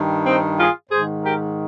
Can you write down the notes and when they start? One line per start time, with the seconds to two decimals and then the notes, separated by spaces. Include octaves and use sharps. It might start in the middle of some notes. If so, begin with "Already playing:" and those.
Already playing: G2 D#3
0.26 C4 D#4
0.59 F4 G#4
0.91 G#2 D#3 G#4 C5
1.23 G4 A#4